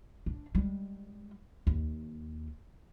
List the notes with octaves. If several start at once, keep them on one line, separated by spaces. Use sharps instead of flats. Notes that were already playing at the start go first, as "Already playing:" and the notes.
D4
G3 G#3
D#2